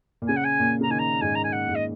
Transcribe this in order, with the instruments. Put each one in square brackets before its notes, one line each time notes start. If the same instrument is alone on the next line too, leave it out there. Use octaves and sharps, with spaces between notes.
[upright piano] A#2
[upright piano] C#3 [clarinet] G#5
[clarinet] F#5
G#5
[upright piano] A#2
[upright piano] C#3 [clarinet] A#5
[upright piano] D#3 [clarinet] G#5
[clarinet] A#5
[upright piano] G#2 [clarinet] G#5
[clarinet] A#5
G#5
F#5
[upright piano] G#2
[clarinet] D#5